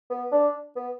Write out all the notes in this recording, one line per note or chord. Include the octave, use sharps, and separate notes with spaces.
B3
D4
B3